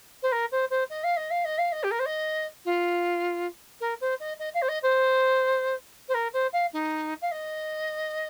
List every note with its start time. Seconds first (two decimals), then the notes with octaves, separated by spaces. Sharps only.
0.23 C5
0.32 A#4
0.52 C5
0.70 C5
0.90 D#5
1.04 F5
1.17 D#5
1.31 F5
1.45 D#5
1.58 F5
1.72 D#5
1.83 G4
1.91 A#4
1.99 C5
2.06 D#5
2.65 F4
3.81 A#4
4.01 C5
4.20 D#5
4.39 D#5
4.54 F5
4.62 C5
4.69 D#5
4.83 C5
6.09 C5
6.14 A#4
6.33 C5
6.53 F5
6.73 D#4
7.22 F5
7.32 D#5